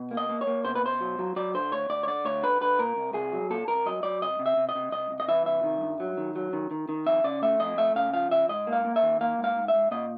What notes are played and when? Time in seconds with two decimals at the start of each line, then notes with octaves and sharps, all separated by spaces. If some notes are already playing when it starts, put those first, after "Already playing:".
Already playing: B2
0.11 A#3
0.17 D#5
0.29 A#3
0.41 C#5
0.47 A#3
0.65 B2 C5
0.75 B4
0.83 B2 C5
1.01 F#3
1.19 F#3
1.36 F#3 D5
1.54 D3 C5
1.71 D2 C#5
1.90 D2 D5
2.03 C#5
2.07 D3 D5
2.25 D2 C#5
2.43 D3 B4
2.61 D3 B4
2.79 A#2 A#4
2.96 C2
3.14 C2 G#4
3.33 F#3
3.50 A#2 A4
3.68 C2 A#4
3.86 F#3 D#5
4.03 F#3 D5
4.22 C2 D#5
4.39 C3
4.46 E5
4.57 C3
4.69 D#5
4.75 C3
4.92 C2 D#5
5.11 C2
5.20 D#5
5.28 E3 E5
5.46 C2 E5
5.64 D#3
5.81 G2
6.00 F#3
6.18 D#3
6.36 F#3
6.53 D#3
6.71 D#3
6.89 D#3
7.06 F2 E5
7.24 C#3 D5
7.42 A3 E5
7.59 F2 D#5
7.78 A3 E5
7.95 C#3 F5
8.13 F3 F5
8.31 C#3 E5
8.49 G#2 D#5
8.67 A#3
8.73 F5
8.85 A#3
8.96 E5
9.03 D#3
9.21 A#3 F5
9.38 G#2
9.44 F5
9.56 G#2
9.68 E5
9.74 G#2
9.91 A#2 D#5